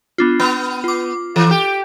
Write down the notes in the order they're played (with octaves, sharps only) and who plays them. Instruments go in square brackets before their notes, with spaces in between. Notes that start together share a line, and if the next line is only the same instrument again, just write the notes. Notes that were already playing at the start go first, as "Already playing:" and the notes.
[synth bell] B3 D4 F4
[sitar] B3 [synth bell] B5 F6
[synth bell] F4 D6
[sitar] E3 [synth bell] A4
[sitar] G4